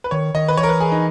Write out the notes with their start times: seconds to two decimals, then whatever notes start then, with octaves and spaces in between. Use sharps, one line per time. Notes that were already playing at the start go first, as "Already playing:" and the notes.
0.04 B4
0.11 D#3 C#5
0.35 D#3 D#5
0.48 B4
0.57 E3 C#5
0.63 A#4
0.69 B4
0.80 G#4
0.92 D#4